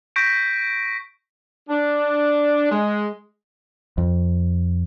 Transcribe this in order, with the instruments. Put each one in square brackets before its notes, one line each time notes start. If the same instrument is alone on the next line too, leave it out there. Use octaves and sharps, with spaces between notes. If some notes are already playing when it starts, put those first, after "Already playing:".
[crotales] C#6 G6 A#6 B6 D7
[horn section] D4
G#3
[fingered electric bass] F2